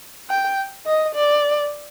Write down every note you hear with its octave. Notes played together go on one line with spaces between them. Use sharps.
G5
D#5
D5